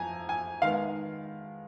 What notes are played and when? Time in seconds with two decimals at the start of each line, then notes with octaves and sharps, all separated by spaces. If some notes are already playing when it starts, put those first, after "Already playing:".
Already playing: F2 G#5 A#5
0.29 G#5
0.62 D#3 G#3 B3 F5